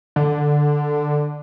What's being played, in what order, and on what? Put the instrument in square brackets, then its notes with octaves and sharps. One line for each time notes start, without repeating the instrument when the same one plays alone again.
[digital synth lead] D3